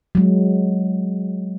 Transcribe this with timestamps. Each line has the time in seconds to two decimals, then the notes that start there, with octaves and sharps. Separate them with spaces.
0.15 F#3 G#3